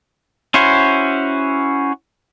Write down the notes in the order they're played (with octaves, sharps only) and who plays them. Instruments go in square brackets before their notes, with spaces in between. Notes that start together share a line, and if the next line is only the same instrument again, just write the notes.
[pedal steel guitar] C#4 E4 F#4 C5